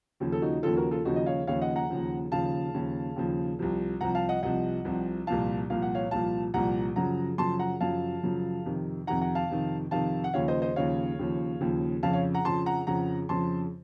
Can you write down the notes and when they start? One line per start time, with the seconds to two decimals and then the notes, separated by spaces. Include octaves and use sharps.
0.20 D#2 C#3 F3
0.32 A4
0.42 D#4 F#4
0.63 D#2 C#3 F3 F4 A4
0.77 F#4 A#4
0.91 F4 A4
1.05 D#2 C#3 F3 D#4 F#4
1.16 D#5
1.26 C#5 F5
1.47 D#2 C#3 F3 C#5 F5
1.61 D#5 F#5
1.76 F#5 A#5
1.90 D#2 C#3 F3
2.32 D#2 C#3 F3 F5 A5
2.74 D#2 C#3 F3
3.16 D#2 C#3 F3
3.59 C2 C3 F3
4.01 C2 C3 F3 F#5 A#5
4.15 F5 A5
4.29 D#5 F#5
4.43 C2 C3 F3 D#5 F#5
4.85 C2 C3 F3
5.27 C2 A#2 F3 F5 A5
5.70 C2 A#2 F3 F5
5.82 F#5
5.95 C#5 F5
6.11 C2 A#2 F3 F5 A5
6.54 C2 A#2 F3 F#5 A#5
6.96 F#2 C#3 F3 F#5 A#5
7.38 F#2 C#3 F3 A5 C6
7.59 F#5 A#5
7.81 F#2 C#3 F3 F5 A5
8.23 F#2 C#3 F3
8.65 F2 C3 D#3
9.07 F2 C3 D#3 F#5 A#5
9.21 F#5 A#5
9.35 F5 A5
9.50 F2 C3 D#3
9.91 F2 C3 D#3 F5 A5
10.24 F#5
10.34 D#2 C#3 F3 C#5 F5
10.48 C5 D#5
10.62 C5 D#5
10.76 D#2 C#3 F3 C#5 F5
11.19 D#2 C#3 F3
11.60 D#2 C#3 F3
12.03 F2 C#3 F3 F5 A5
12.13 C#5 F5
12.34 F#5 A#5
12.45 F2 C#3 F3 A5 C6
12.66 F#5 A#5
12.87 F2 C#3 F3 F#5 A#5
13.29 F2 C#3 F3 A5 C6